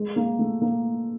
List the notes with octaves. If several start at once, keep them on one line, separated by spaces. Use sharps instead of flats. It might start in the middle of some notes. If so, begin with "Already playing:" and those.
Already playing: G#3
A#3
A3
A#3